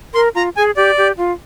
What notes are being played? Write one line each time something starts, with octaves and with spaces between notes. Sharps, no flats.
A#4 C6
F4 A#5
G#4 G#5
G4 D5
G4
F4